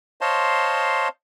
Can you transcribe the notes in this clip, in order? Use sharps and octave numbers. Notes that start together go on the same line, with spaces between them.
C5 C#5 D#5 F5 A5 C6